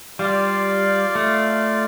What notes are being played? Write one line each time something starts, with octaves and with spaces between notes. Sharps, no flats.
G3 F4 D5 F5
A3